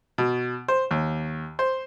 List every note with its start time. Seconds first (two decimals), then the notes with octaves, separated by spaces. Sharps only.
0.18 B2
0.68 C5
0.91 D#2
1.59 C5